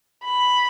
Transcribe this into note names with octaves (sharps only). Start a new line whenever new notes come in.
B5